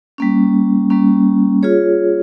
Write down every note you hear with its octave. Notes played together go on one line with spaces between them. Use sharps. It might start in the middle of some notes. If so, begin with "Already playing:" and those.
G3 A#3 C#4
G3 A#3 C#4
F4 G#4 C#5